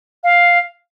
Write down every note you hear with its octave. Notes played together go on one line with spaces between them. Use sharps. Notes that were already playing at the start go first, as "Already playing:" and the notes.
F5